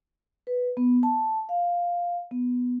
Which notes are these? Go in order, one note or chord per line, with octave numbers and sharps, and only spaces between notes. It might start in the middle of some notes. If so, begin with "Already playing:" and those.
B4
B3
A5
F5
B3